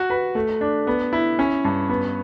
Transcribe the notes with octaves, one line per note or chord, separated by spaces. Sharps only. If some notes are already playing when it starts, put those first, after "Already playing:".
Already playing: F#4
B4
A3
D4
B3
E4
C#4
G2
B3